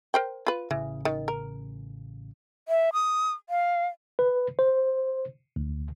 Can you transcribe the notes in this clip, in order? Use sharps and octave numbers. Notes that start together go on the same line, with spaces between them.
A#4 C5 G5
F4 B4
A1 C#3 E3
D#3
A#4
E5
D#6
F5
B4
C5
D2